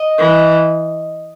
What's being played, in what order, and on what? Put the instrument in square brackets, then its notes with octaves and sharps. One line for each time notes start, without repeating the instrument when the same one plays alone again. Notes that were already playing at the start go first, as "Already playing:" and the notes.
Already playing: [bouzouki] D#5
[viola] E3